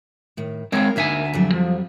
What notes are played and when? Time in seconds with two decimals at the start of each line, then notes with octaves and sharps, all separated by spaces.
0.37 A2 D#3
0.72 G#3 C4 A#4 C#5 F5
0.96 D2 A#3 D#4 A#4 E5 G#5
1.34 F2 F#3 G3
1.53 F3